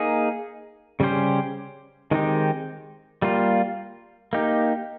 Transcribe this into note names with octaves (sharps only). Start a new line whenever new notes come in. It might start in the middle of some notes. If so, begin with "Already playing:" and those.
Already playing: A#3 D#4 G#4
C#3 G3 C#4 G4 C5
D#3 G#3 C4 D#4 G4
G3 A#3 F4
A#3 D#4 G4